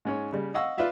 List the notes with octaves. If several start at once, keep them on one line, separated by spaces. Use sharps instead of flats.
G#2 C#4 C#5
C#3 G3
D#5 F5 F#5 C#6 E6
F4 B4 D5 E5 F5